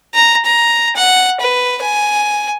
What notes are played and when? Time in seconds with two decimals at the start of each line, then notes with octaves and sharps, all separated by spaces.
0.14 A#5
0.45 A#5
0.96 F#5
1.41 B4
1.82 G#5